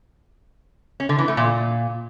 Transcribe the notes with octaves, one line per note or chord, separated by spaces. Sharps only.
C#4
D3
E3
A3
A#2